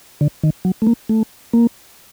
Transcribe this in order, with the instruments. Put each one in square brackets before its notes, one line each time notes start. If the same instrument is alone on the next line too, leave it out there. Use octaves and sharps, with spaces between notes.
[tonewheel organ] D3
D#3
F#3
A3
A#3
A3
A#3